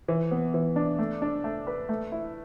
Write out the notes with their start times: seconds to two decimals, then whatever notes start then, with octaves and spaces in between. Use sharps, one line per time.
0.08 E3
0.31 B3
0.54 E3
0.76 D4
0.99 A3
1.22 D4
1.44 A3
1.67 B4
1.89 A3
2.12 E4